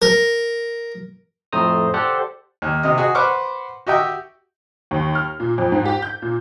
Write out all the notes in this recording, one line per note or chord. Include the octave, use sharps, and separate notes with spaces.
A#4
F2 A2 A3 C5 A#5 D#6
G4 A4 C5 D5 F#5
D#2
C3 D#5
F#4 G#4 D#5
B4 C5 F#5 C#6 D6 F6
F#4 G4 D#5 E5 G5
D#2
F6
A#2
F2
G#2
G4
G6
A#2